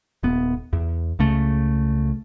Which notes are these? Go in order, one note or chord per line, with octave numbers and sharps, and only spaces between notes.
D#1 B3
E2
C#2 C#3 A3